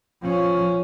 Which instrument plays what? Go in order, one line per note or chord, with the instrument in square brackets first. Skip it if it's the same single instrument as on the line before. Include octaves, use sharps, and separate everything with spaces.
[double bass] F3 C#4